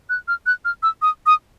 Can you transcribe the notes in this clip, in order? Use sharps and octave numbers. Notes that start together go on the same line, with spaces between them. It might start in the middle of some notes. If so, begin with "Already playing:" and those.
F#6
F6
F#6
F6
E6
D#6
D#6